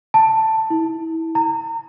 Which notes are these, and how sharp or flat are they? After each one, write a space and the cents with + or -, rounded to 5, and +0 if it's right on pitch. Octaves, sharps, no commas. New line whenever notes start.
A5 +10
E4 -25
A#5 -30